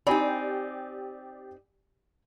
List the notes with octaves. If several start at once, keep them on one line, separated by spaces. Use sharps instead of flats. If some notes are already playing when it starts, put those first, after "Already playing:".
C4 D#4 G4 D5 G#5 B5